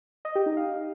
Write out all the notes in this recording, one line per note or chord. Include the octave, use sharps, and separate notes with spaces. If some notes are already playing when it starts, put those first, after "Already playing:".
D#5
G4
D#4
F5